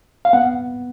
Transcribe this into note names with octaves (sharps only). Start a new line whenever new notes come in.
F5
B3 F#5